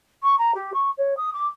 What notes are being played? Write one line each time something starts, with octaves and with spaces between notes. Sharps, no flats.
C#6
A#5
G4
C#6
C#5
D#6
D6